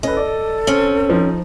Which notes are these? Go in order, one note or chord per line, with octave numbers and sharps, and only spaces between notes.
C#4 A4 B4 D#5
D5
C4 C#4 G7
F3 D#4